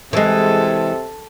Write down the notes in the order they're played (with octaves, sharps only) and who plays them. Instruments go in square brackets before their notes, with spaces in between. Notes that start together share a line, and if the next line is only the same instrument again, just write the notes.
[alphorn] C3 [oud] E3 G#3 [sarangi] A4